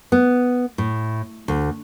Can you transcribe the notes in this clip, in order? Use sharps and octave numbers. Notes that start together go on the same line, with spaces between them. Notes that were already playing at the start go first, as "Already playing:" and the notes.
B3
A2
D2